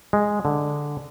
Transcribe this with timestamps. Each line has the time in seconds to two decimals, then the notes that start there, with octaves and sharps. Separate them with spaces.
0.13 G#3
0.45 D3